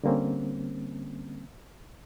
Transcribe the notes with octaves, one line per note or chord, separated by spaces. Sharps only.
D3 G3 A#3 C4 C#4